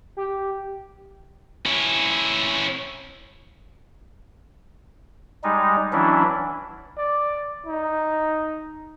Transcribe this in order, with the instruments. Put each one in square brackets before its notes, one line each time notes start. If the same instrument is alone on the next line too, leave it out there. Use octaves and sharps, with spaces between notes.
[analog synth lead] G4
[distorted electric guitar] C#4 E4
[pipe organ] G3 G#3 D#4
E3 F#3 C#4 D4 E4
[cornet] D5
D#4